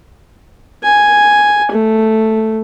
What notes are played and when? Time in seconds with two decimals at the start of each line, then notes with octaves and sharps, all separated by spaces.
0.84 G#5
1.72 A3